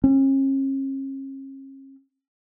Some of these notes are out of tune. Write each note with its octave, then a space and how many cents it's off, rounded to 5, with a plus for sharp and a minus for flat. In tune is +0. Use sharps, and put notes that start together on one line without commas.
C#4 -40